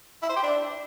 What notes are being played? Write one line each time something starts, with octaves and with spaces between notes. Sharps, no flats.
E4
C5
G4
D4